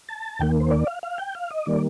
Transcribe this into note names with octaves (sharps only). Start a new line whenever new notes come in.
A5
D#2 D#3 A#3 G5
C5
D5
F5
F5
G5
F5
D#5
D#3 G3 A#3 D5